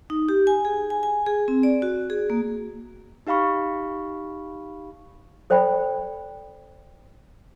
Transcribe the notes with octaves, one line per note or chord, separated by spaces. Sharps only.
D#4
G4
G#5
G#4
G#5
G#5
G#4
C4
D5
F#4
G#4
A#3
D#4 G4 F5 B5 C#6
A4 C5 D5 G5 B5